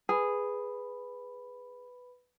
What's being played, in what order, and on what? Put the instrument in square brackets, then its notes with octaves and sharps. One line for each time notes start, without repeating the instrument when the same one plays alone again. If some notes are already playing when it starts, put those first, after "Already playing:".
[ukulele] G#4 [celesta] B4 B5